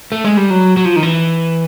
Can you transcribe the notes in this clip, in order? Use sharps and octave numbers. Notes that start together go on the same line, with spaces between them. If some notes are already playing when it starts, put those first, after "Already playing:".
A3
G#3
G3
F#3
F#3
F3
D#3
E3